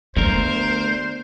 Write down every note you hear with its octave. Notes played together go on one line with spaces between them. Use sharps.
D2 B3 A#4 C5